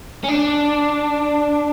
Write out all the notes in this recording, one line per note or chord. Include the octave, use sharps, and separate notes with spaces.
C#4
D4